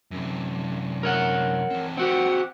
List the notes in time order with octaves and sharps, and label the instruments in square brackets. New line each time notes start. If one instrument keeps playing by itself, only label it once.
[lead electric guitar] F#2 C3
[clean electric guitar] A#4 C#5 F#5
[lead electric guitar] E3 C4
[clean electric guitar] C4 F#4 G4 [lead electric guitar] F#5